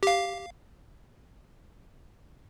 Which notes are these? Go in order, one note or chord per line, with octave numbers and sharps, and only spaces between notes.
G4 F5